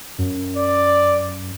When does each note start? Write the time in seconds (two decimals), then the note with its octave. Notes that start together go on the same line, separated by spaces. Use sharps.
0.18 F#2
0.57 D5